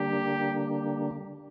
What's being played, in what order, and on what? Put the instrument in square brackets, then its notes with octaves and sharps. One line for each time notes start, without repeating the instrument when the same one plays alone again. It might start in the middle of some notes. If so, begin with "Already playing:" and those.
Already playing: [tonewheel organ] D3 G3 A#3 D4 [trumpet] G4